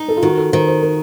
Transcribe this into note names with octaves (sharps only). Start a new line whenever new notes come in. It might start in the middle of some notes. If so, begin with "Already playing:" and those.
Already playing: D#4
A4
F4
D#3 F#4
A4
D#3 C5
C5
A#4